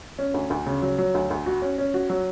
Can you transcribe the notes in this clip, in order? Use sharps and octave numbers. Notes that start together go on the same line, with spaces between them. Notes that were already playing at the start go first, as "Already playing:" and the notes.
C#4
D2
D2
C#3
F#3
F#3
D2
D2
F#4
C#4
C#4
F#4
F#3